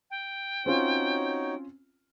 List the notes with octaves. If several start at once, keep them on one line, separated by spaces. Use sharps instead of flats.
G5
C4 C#4 D#4 F4 F#4 C#5